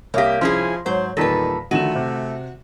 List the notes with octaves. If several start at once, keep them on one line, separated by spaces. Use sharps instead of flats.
C2 A#3 G4 C#5 E5 F5 D#6 A#6
F3 C#4 E4 G#4 C6
G#2 F#3 C5 C#5
E2 A#2 D#3 G3 A4 B4 A#6 B6
D3 D#3 F3 A3 F#4 D#7 E7
C3